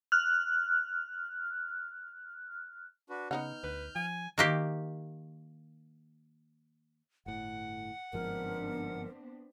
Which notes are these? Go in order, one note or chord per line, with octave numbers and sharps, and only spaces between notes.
F6 F#6
D4 F#4 B4
C#3 B3 D#4 F#5 F6 G6
D2 B4
F3 G#5
D#3 A#3 G4
G1 A2 F#5
G1 G#2 F3 B3 C4 D4 A#4